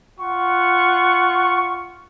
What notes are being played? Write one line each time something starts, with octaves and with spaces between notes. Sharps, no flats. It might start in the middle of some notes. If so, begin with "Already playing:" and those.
F4 F#5 C#6